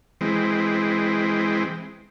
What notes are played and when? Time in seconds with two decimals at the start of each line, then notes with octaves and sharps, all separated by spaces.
0.21 E3 G#3 C4